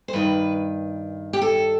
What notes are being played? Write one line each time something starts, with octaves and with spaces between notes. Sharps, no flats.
C5
G2 D#3 B4
G4
A4